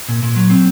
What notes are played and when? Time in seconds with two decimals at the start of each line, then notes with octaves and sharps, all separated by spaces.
0.08 A#2
0.23 A#2
0.36 F#3
0.50 C4